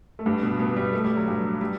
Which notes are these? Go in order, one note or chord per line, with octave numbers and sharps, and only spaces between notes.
A3
G2 G3
B2 B3
B2 B3
G2 G3
A3
G3
F#3
G2 G3
G3